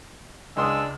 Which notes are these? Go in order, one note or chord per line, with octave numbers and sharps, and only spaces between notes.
C#2 G#3 D4 C6 D#6 E6